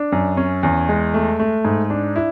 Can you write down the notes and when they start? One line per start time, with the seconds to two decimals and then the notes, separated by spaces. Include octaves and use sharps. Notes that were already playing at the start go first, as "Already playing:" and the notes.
Already playing: D4
0.12 F#2
0.37 C#4
0.63 E2
0.89 G#3
1.14 A3
1.39 A3
1.65 G#2
1.90 D4
2.16 E4